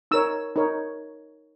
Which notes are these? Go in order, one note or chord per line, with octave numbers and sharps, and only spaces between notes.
D#4 A#4 C#5 E6
D#4 A#4 C#5